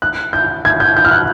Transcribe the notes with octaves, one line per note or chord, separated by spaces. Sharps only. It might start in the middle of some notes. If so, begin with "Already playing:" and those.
F#6
G6
G#6
G6
G6
F6
F#6